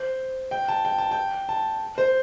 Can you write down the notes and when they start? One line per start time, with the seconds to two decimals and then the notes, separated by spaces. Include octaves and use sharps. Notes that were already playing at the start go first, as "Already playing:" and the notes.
Already playing: C5
0.51 G5
0.68 A5
0.85 G5
0.98 A5
1.11 G5
1.49 A5
1.98 C5